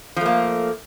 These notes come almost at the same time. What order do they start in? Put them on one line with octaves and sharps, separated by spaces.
F3 A3 A#3